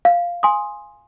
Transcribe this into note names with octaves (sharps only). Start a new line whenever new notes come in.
F5
G#5 C6 D#6